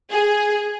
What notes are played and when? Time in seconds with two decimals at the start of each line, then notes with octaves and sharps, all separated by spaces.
0.12 G#4